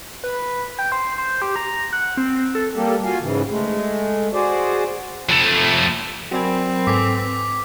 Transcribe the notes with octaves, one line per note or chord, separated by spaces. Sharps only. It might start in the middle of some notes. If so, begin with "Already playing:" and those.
B4
G5
C5
C5
G4
A#5
F#5
C4
A4
G3 A#3 G4 A4
F4 F#4 F5 G#5
G#2 C#3 E3
G#3 A3
F#4 G#4 C5 D5
F2 A3
F#3 C4 F#4 A#4 D5 G#5 B5
G#2 A4 B4 G#5 D6 E6 B6